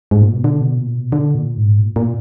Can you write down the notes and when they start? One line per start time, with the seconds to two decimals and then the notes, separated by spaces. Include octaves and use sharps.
0.11 G#2
0.22 A#2
0.33 B2
0.44 D3
0.61 B2
0.78 A#2
0.95 B2
1.12 D3
1.35 A#2
1.57 G#2
1.79 A#2
1.96 A#2